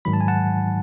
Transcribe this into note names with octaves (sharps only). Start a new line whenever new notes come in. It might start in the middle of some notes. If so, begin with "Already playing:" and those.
G#2 D#3 F#3 B5
A5
G#5
F#5 A5